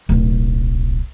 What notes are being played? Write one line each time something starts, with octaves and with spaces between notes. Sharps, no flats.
D1 B1